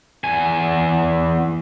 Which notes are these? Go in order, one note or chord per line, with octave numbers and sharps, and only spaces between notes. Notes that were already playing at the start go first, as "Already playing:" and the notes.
E2 G#5